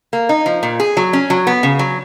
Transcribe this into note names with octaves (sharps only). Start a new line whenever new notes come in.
A#3
D#4
F3
A#2
G#4
F#3
C#4
F#3
B3
C#3
F#3